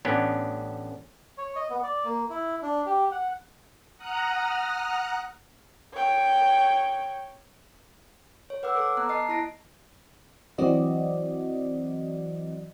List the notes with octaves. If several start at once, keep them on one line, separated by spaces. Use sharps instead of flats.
A1 B3 C#4 D4
C#5
D#5
B3
D5
A#3
E4
D4
G4
F#5
F#5 A#5 D#6 F6 F#6
C#5 G5
C#5
B4 F#5 D6 E6
A4 B4 D6
B3 A#5 F#6
D#5 A5 C7
E4 A5 A#6 D7
E3 F#3 C4 F#4 D5 D#5